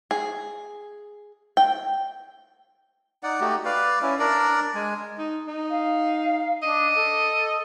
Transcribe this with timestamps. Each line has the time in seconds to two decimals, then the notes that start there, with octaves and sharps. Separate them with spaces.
0.11 G#4
1.57 G5
3.23 D#4 D5 F#5
3.40 A3 D#4 F#4 G4
3.65 B4 D5 F5
4.02 C#4 E4
4.19 D4 A#4 D5
4.75 G#3 G#5
5.18 D#4
5.47 D#4
5.70 F5
6.62 D4 D#5
6.95 A4